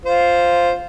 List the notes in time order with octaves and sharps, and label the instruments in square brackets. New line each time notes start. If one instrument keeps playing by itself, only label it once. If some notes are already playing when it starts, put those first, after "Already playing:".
[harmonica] F4 C5